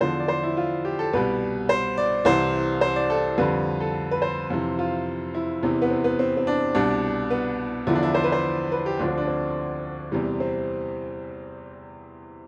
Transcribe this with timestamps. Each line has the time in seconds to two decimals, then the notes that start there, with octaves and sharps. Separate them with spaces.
0.01 E2 D3 F3 C5
0.20 D5
0.28 C5
0.43 E4
0.57 F4
0.85 G4
0.99 A4
1.13 C2 B2 G3 B4
1.69 C5
1.97 D5
2.25 C2 C3 E3 C5
2.81 C5
2.96 D5
3.10 A4
3.38 F2 D3 G3 B4
3.81 A4
4.11 B4
4.22 C5
4.50 F2 C3 E3
4.79 F4
5.35 E4
5.63 E2 C3 E3
5.82 B3
5.91 C4
6.04 B3
6.19 C4
6.37 C4
6.47 D4
6.75 C2 B2 G3 D4
7.30 B3
7.87 E2 D3 F3 E4
7.95 D4
8.03 E4
8.15 C5
8.24 B4
8.32 C5
8.72 B4
8.86 G4
8.99 D2 D3 F3 D4
9.08 C4
9.18 D4
9.28 C4
10.12 E2 C3 E3 G3
10.40 C4